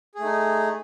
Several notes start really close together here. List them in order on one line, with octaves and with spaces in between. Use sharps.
G#4 A3 D#4